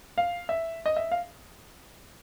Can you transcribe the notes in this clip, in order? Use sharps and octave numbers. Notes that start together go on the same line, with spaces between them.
F5
E5
D#5
E5
F5